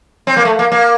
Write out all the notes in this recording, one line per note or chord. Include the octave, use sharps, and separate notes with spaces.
C4
A#3
A3
A#3
A#3